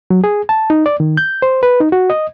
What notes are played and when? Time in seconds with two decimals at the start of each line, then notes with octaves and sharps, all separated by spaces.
0.10 F#3
0.24 G#4
0.49 A5
0.70 D#4
0.86 D5
1.00 D#3
1.17 G6
1.42 C5
1.63 B4
1.80 D#4
1.92 F#4
2.10 D#5